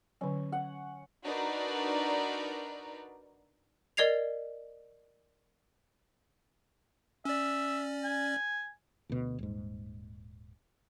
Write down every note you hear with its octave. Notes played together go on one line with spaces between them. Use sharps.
D3 F#3 C#4
F#5
D4 D#4 F#4 A#4 B4 D5
A#4 D5 D#5 G#6 C7 F7
C#4 D5 E5
G#5
D2 B2
D#1 G#2